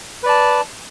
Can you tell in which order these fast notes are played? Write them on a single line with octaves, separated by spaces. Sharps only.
B4 D5 A5